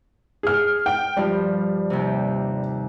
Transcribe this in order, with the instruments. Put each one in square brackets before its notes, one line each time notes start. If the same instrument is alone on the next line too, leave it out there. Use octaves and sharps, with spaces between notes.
[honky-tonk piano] G#4 F6
G5
[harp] G2 F3 [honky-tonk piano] G3
[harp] D#2 C3